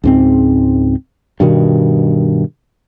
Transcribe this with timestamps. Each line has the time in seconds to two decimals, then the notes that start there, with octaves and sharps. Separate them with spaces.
0.04 C#2 G#2 C4
1.40 G2 B2 D#3